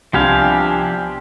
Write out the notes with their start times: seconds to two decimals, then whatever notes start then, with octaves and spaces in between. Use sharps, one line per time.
0.13 C2 F3 B3 D4 G4 F5 G#5 C6